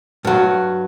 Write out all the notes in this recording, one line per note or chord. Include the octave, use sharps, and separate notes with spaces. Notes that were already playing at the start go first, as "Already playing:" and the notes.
G2 F#3